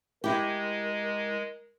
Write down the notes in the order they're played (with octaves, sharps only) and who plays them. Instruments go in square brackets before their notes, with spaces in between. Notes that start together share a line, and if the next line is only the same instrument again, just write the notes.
[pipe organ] G#3 [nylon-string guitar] E4 G4 [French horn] A#4